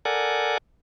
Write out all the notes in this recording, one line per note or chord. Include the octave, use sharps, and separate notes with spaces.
A4 A#4 D5 F#5 G#5